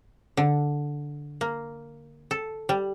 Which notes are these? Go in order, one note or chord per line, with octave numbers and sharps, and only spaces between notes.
D3
A#3
A4
G3